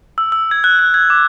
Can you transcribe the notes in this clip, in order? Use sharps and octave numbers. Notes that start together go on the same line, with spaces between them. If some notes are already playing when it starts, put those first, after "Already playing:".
E6
E6
G#6
F#6
F#6
G#6
D6